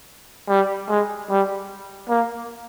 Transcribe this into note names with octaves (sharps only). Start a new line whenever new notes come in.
G3
G#3
G3
A#3